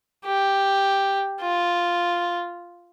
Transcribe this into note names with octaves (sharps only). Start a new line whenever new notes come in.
G4
F4